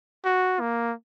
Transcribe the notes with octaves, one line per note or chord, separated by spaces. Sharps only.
F#4
A#3